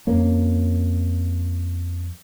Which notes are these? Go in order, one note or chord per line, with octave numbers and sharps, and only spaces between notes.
F2 A#3 C#4